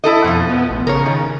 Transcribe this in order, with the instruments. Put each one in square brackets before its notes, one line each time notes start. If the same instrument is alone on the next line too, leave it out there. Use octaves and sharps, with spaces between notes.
[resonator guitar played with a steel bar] E4 A4 D#5
[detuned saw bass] F2 [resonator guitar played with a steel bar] B2 F3
[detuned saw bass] B3
A1
[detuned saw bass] C#3 [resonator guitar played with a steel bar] A#4 C#5
[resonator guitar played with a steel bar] D#3